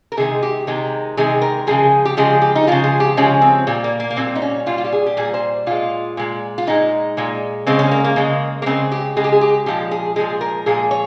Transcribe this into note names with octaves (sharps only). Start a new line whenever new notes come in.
A#4
C3 D#3 G#3 G#4
G4
C3 D#3 G#3
C3 D#3 G#3 G#4
A#4
C#3 F3 G#3 G#4
G4
C#3 F3 G#3 G#4
G4
D#4
C#3 F3 G#3 F4
G#4
G4
C#3 F3 G#3 C#4
C4
A#2 G3
A#3
A#3
A#3
A#2 G3 C4
D#4
C#4
A#2 G3 F4
F4
G4
G#4
G4
A#2 G3 G#4
C5
A#2 G#3 F4
A#2 G#3
F4
A#2 G#3 D#4
A#2 G#3
C#3 G#3 C4
C#4
A#3
A#3
C#3 G#3
A#3
C#3 G#3 C4
G4
C#3 G#3 G#4
G4
G#4
G4
A#2 F3 G#3 G4
G#4
A#2 F3 G#3 G#4
A#4
A#2 F3 G#3 G#4
C#5